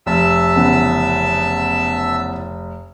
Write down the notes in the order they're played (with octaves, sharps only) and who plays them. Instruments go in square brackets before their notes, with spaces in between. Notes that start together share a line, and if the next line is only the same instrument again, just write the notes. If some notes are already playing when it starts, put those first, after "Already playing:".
[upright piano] F1 [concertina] E5 A5 E6
[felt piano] C#3 E3 B3